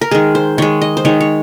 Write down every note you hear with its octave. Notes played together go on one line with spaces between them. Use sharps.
A#4
D#3 G#3 G#4
C5
D#3 G#3 C#5
D#5
C5
D#3 G#3 C#5
C#5